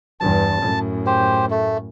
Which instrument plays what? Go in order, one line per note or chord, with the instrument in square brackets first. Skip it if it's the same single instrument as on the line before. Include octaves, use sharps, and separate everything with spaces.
[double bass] E2 G2 [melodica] A5
[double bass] F#2 A2
[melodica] G4 C5
A3